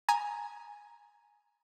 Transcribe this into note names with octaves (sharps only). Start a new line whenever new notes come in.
G#5 A#5 D#6 G#6